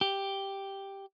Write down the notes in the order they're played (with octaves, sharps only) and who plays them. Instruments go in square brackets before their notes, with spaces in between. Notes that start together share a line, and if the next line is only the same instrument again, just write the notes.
[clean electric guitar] G4